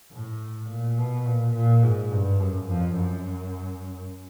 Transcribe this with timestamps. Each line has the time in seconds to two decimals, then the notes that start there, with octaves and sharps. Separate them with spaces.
0.12 A2
0.69 A#2
0.98 B2
1.26 A#2
1.55 A#2
1.83 G#2
2.11 G2
2.40 F#2
2.68 F2
2.96 F#2